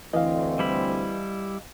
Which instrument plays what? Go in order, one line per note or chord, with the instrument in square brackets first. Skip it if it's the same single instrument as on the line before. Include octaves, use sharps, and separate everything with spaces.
[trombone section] D2 C4 [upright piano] E3 [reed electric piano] D#5 F5
[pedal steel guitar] G3 E4 B5